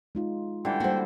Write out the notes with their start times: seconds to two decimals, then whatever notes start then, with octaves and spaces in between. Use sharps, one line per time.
0.15 G#3 D#4 F4
0.65 D3 E3 G3 G5
0.80 G3 A#3 F#4 C5